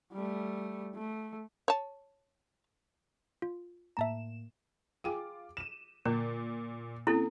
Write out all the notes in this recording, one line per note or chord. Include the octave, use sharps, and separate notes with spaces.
G3 A3
A3
C#5 A5
F4
A2 A#3 E5 A5 A#5 E7
F4 G#4 G5 G#5 D6
D#7 E7
A#2 D3 A#3
A#3 C4 C#4 E4 A4